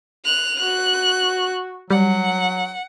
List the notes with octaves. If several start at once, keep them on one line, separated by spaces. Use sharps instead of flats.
F#6 F7
F#4 F#6
F#3 G3 F#5